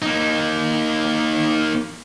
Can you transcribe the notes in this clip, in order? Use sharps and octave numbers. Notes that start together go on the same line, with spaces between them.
A#3 D#4